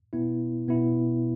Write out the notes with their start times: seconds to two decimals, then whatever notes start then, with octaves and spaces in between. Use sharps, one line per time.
0.13 B2 B3 E4
0.67 B2 B3 E4